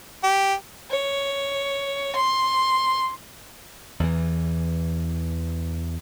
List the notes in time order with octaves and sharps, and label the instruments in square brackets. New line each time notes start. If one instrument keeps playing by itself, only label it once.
[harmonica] G4
[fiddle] C#5
C6
[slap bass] E2 E3